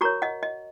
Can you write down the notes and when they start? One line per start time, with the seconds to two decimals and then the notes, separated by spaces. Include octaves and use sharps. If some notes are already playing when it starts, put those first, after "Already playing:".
0.01 F#4 A#4 C#5 A#5 C#6
0.22 D#5 F#5
0.43 D#5